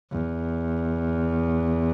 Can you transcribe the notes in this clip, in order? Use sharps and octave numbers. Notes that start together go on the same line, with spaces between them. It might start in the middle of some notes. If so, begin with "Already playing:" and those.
E2